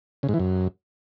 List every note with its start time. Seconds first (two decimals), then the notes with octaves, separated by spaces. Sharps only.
0.23 C#3
0.29 G#2
0.34 E3
0.39 F#2